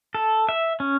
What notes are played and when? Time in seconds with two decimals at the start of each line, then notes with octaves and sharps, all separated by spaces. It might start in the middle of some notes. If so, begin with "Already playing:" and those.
0.15 A4
0.49 E5
0.80 C#4